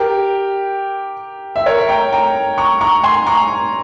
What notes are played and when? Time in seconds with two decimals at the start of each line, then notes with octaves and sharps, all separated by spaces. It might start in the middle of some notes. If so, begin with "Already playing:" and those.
Already playing: G4 A#4
1.56 E5
1.66 A#4 C#5
1.89 G5 A#5
2.13 G5 A#5
2.58 A#5 C#6
2.81 A#5 C#6
3.04 G#5 C6
3.27 A#5 C#6